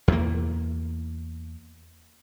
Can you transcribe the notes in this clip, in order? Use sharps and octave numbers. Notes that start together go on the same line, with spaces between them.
E2 A#3